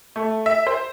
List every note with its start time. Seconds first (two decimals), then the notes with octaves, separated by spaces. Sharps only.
0.16 A3
0.46 E5
0.67 C5